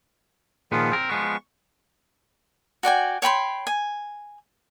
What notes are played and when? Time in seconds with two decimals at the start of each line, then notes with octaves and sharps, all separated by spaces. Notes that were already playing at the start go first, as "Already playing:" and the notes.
0.72 A#2 D#3 F3 B3 F4 G#4
0.92 C4 A#4
1.09 F3 G#3 B3 C#6
2.83 F#4 D5 G5 G#5
3.22 C#5 G5 B5 C6
3.67 G#5